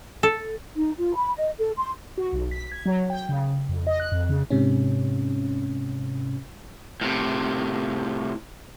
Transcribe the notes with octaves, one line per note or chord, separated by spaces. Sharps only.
A4
D#4
F4
B5
D#5
A4
C6
F#4
B1
B6
G#6
F#3
G5
C#3
F2
D#5
F#6
F2
C#3
G#2 C3 C#4
A2 C3